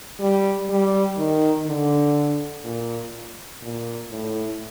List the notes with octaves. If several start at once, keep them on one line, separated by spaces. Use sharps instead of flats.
G3
G3
D#3
D3
A#2
A#2
A2